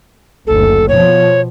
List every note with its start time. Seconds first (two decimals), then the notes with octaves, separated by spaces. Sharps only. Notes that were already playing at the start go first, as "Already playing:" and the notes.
0.47 F#1 D2 A4
0.89 B2 F3 C#5